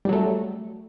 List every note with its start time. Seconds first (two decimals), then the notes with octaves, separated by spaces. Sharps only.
0.05 G3
0.09 F#3
0.13 A3